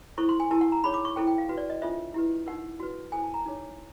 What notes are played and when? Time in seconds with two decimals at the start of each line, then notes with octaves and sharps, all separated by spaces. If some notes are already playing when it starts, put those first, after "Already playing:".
0.18 E4 A4 C5 C#6
0.29 C6
0.40 G#5
0.51 E4 G4 A#4 A5
0.61 F#5
0.72 A#5
0.84 D#4 G#4 C#5 B5
0.94 D6
1.05 C#6
1.16 E4 A4 C5 G5
1.27 G5
1.38 F5
1.49 F#4 B4
1.57 D5
1.70 D#5
1.81 D4 F4 A4 C5 E5
2.14 E4 G4 B4
2.47 D#4 G4 A#4 F#5
2.80 F#4 B4
3.12 E4 A4 C5 G#5
3.24 A5
3.34 A#5
3.46 D#4 G#4 C#5